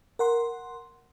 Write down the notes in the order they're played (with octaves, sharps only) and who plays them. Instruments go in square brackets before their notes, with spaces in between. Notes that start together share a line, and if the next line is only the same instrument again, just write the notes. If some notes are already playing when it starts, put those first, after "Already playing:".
[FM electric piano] A#4 F#5 C6